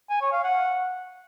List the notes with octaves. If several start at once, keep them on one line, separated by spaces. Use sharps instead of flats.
G#5
C#5
F5
F#5